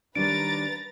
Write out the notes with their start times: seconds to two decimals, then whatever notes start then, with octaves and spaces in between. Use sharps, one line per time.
0.15 D#3 G3 C#4 D4 B4 A#5 A6 D7